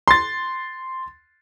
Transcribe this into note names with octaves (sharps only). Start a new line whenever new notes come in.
C6 A6